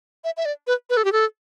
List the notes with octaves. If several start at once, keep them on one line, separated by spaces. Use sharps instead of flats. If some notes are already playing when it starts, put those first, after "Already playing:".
E5
E5
D5
B4
B4
A4
G4
A4